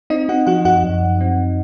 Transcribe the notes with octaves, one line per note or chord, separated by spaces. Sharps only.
C4 D#4 D#5
C4 F#4 F#5
F3 F#4 F#5
F#2 F#4 F#5
F#2
F#2
C4